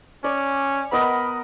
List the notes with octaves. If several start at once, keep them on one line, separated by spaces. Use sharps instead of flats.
C#4 D5
B3 A#4 D#5 B5